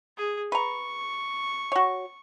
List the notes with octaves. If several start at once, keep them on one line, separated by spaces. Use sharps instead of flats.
G#4
B4 A#5 C#6
F#4 C#5